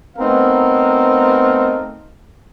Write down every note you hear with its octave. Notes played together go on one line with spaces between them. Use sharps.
A3 B3 C4 D#4 A#4 F5